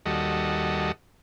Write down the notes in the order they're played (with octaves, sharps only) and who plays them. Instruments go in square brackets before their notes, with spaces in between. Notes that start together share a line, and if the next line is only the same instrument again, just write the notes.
[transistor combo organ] D#2 G3 F#4 A4 D#5